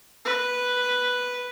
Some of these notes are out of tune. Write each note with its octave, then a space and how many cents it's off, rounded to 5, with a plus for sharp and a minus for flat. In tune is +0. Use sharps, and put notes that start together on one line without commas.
B4 +0